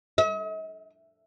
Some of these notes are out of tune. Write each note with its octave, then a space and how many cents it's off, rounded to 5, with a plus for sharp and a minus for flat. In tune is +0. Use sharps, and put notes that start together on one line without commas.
D#5 +45